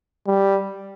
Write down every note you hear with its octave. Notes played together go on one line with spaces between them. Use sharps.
G3